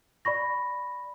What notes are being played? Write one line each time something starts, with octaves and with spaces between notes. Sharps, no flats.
D5 B5 C#6 A#6